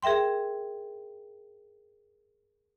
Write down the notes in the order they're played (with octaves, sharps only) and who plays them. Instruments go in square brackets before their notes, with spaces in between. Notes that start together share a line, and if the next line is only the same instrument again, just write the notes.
[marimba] G#4 A#4 E5 G5 C6